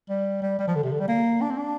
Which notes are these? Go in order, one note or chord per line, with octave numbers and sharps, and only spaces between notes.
G3
G3
G3
F3
D3
C3
D3
G3
A#3
D4
C4
D4